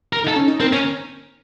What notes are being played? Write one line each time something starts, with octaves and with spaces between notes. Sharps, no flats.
A#4
D#4 A4
C#4
D#4
C4 A#4
C#4 A#4